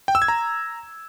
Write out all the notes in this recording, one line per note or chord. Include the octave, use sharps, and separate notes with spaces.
G5
E6
G#6
A#5